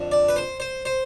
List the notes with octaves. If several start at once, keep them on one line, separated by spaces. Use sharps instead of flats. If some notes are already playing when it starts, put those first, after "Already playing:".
Already playing: F2 D3 F3
D5
B4
C5
C5
C5